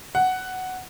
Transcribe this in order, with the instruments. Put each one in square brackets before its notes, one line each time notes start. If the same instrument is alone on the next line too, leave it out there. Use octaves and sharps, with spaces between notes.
[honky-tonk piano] F#5